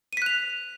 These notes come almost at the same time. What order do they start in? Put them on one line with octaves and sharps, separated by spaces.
D#7 B6 F#6 F7